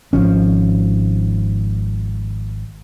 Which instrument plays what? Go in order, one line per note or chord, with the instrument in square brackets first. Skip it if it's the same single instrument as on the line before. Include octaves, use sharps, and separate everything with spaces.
[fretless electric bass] G#1 F3 C#4